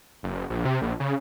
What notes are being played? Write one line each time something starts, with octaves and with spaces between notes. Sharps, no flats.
F#1
A#1
C3
A#1
C#3